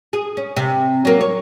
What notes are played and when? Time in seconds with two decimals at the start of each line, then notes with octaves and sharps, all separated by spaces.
0.13 G#4
0.37 C#4
0.57 C3
1.05 F#3 A#3
1.21 C#5